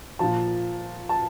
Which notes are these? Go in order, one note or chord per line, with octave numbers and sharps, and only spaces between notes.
A#2 F3 A5
A5